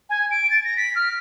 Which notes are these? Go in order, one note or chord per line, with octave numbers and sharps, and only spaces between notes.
G#5
D7
A6
A#6
B6
F6